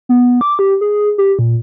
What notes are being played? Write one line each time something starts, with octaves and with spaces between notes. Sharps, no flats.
B3
D6
G4
G#4
G4
A#2